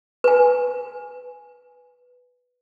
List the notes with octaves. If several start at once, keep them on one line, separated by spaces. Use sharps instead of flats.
B4 G#5